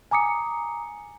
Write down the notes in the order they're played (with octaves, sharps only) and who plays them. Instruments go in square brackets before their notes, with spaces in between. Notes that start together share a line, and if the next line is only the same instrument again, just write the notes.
[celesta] G#5 A#5 D6 D#6 C#7